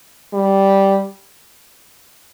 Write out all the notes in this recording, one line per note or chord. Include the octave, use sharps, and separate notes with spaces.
G3